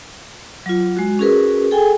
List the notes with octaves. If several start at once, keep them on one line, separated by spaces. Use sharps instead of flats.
F#3 F4
G#3 F#4
C#4 F#4 G#4 A#4 B4
G#4 A4 G5 G#5